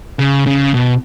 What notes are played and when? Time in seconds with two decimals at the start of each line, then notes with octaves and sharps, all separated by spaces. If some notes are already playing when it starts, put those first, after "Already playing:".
0.19 C#3
0.47 C#3
0.74 B2